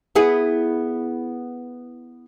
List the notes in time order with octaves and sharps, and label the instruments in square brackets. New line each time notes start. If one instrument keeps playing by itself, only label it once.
[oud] B3 E4 G#4